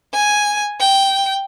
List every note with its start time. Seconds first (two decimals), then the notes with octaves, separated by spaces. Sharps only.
0.14 G#5
0.80 G5